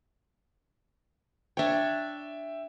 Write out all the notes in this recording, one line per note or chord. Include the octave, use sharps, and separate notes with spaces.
D4 C#5 E5 G5